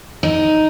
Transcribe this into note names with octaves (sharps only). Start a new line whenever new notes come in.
D#4